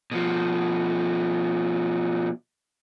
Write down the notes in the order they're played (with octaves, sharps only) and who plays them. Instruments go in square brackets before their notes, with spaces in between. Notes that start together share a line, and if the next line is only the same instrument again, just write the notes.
[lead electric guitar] B2 F3